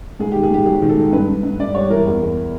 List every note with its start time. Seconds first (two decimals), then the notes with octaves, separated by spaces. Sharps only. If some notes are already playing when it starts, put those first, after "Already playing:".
0.19 G#2 G#4
0.32 D#3 G4
0.43 G#4
0.51 G#2 G4
0.66 F#3 G#4
0.82 D#3
0.89 A4
0.97 G#2
1.12 G2 B4
1.28 G2
1.43 G2
1.59 G2 D5
1.74 G3 C#5
1.90 E3 A#4
2.06 E2
2.21 E2